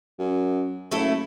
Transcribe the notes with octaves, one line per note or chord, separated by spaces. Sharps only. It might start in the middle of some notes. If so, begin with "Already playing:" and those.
F#2
F#1 A3 E4 A4